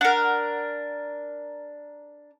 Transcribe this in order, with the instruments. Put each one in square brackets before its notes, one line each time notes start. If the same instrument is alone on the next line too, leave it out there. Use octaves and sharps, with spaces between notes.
[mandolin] D4 A#4 [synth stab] F#5